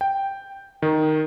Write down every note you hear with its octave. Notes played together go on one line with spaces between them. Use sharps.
G5
D#3